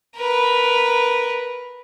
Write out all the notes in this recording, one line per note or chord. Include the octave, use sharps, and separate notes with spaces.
A#4 B4